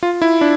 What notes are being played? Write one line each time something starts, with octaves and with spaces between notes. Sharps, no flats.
F4
E4
D4